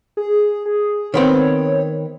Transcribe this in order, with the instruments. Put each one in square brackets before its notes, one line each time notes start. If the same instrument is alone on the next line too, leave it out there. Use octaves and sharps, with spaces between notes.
[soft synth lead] G#4
G#4
[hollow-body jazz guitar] D#3 B3 C4 [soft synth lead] C#5